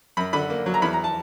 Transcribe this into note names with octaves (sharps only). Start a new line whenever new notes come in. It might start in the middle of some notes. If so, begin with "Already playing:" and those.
F#2 B5
D3 B5
A#3
F#3
A#5
E2 B5
A#5
A5